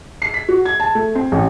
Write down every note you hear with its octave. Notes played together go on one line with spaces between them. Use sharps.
C7
B6
F#4
G#6
A5
A3
C4
A1